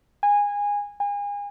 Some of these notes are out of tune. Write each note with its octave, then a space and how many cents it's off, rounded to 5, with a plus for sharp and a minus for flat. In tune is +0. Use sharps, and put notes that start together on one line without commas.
G#5 -20
G#5 -35